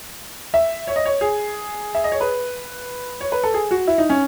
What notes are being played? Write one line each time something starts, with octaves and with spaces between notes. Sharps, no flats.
E5
C#5
D#5
C#5
G#4
E5
D#5
C#5
B4
C#5
B4
A4
G#4
F#4
E4
D#4
C#4